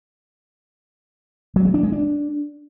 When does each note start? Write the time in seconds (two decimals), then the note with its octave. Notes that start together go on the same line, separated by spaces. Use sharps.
1.56 F#3
1.65 G#3
1.74 D4
1.83 G#3
1.92 D4